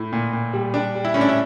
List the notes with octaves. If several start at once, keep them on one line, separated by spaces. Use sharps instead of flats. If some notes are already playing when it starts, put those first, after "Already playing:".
Already playing: A2
A#2
A#2
G3
G3 D4
G3
E4
A2 C#4
D4
E4